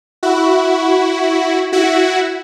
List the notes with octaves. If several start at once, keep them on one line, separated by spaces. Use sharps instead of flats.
E4 F#4
E4 F#4